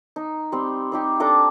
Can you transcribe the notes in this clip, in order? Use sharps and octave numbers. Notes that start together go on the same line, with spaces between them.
D#4
G3 C4
C4 D#4 G4
D4 A4 A#5 D6